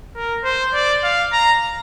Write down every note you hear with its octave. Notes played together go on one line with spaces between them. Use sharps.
A#4
C5
D5
F5
A#5